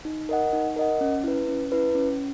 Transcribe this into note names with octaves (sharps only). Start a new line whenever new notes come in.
D#4
A#4 D#5 F#5
D#4
A#4 D#5 F#5
C#4
E4 B4
C#4
E4 B4
C#4